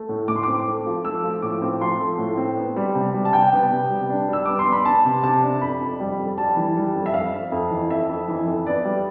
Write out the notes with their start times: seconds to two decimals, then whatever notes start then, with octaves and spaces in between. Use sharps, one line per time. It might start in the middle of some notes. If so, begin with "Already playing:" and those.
Already playing: A3
0.09 A2
0.28 A2 D6
0.36 C6
0.43 C4 D6
0.67 A3
0.86 F3
1.05 A3 E6
1.24 F3
1.42 A2 D6
1.62 C4
1.81 F3 C6
2.00 A3
2.18 A2
2.37 C4
2.57 B3
2.76 G3
2.95 C3
3.14 G3
3.25 A5
3.33 C3 G5
3.53 B3
3.72 C3
3.90 G3
4.10 D4
4.29 G3 E6
4.46 B3 D6
4.59 C6
4.66 B3
4.72 B5
4.85 B3 A5
5.05 C3
5.23 C3 A5
5.42 D4
5.61 F2 B5
5.81 F2
6.00 G3
6.19 F2
6.38 G3 A5
6.57 E3
6.76 G3
6.95 F2
7.06 E5
7.14 F2 F5
7.33 F2
7.52 F2
7.71 E3
7.90 F2 E5
8.09 F2
8.28 E3
8.47 F2
8.66 B3 D5
8.85 G3